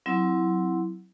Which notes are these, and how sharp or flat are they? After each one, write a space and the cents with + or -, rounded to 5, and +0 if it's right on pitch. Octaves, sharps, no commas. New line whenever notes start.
F#3 +0 C4 +0 E4 +0